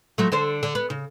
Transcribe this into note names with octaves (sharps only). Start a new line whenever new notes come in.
F3 F#3 A3
D3 A4 C5
D3
B3
C#3